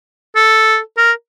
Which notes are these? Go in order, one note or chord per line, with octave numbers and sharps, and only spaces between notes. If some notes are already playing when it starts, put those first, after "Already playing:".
A4
A#4